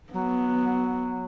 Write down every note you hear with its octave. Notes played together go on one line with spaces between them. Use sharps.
F#3 B3